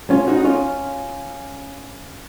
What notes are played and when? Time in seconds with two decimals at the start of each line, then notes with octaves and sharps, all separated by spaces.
0.10 C#4 F4
0.27 D#4 F#4
0.37 D#4
0.44 C#4 F4